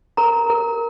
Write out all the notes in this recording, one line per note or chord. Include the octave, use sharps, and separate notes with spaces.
A#4 A#5
A#4